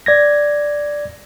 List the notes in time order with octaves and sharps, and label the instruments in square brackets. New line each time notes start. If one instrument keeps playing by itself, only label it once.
[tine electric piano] D5 G#6 A#6